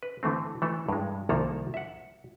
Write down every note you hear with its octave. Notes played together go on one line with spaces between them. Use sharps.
B4
D3 E3 A3 C4
E3 A3 A4
G2 G#3
C2 D#3 F3 A#3 A4 A#5
E5 F#5